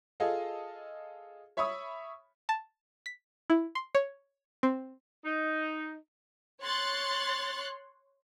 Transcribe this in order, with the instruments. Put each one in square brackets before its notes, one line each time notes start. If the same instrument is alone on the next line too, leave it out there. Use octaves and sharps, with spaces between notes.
[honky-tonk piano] F4 G#4 A4 D#5 F5
C#5 E5 B5 C#6 D#6
[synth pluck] A5
B6
E4
C6
C#5
C4
[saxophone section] D#4
[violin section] C#5 C6 F#6 A6